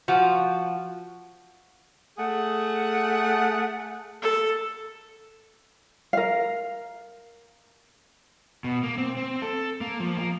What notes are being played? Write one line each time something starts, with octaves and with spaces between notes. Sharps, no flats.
F3 F#4
A3 G#4 F#5
A4
A#4 F5
B2
A#3
C4
C4
A4
A#3
F3
A#3